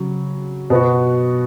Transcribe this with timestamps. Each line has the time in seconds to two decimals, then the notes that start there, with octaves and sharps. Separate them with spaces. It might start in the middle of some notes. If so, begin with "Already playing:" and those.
Already playing: C#3 F#3
0.70 B2 B3 F#4